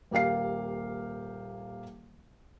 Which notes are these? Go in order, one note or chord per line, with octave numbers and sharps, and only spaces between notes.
D#1 A#3 G4 F5 C7